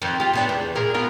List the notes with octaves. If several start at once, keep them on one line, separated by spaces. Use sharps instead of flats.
F2 D#3
F4 G4
C3 B3 D4
E2
A#2 G#4 A#4
B3 F4 A#4